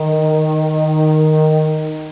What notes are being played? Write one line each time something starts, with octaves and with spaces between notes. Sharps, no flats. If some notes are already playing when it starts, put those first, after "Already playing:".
Already playing: D#3